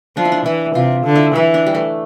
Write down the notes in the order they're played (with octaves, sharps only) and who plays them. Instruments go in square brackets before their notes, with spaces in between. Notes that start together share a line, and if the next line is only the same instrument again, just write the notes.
[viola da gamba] F3 [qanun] D4
[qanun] E4
D4
[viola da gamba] E3 [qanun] E4
[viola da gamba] C3 [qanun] F4
[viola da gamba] D3
[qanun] E4
[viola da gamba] E3 [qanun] E4
[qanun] D4
G3
A3